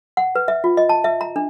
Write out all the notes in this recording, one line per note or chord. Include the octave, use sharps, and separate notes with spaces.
F#5
B4
E5
F4
D#5
A5
E5
A#5
D4